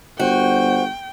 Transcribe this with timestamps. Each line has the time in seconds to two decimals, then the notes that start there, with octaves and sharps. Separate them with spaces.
0.20 G1 F#4 C5 G5